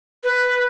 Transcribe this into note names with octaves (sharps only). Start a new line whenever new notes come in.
B4